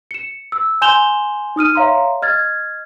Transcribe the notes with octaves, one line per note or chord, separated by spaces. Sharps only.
C#7 E7
E6
G#5 C6 G6 E7 F7 G7
D#4 D#6 F6 D#7
C#5 E5 F5 A#5 C6
D#5 F6 G#6 A6